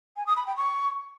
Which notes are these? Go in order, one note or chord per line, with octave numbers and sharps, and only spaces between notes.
G#5
D#6
B5
G5
C#6